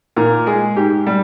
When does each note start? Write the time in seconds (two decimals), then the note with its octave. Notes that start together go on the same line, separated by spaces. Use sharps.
0.16 A#2 A#4
0.46 G#3 G#4
0.76 G#2 G4
1.07 G3